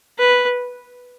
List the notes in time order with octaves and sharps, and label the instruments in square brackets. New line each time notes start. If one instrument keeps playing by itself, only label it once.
[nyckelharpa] B4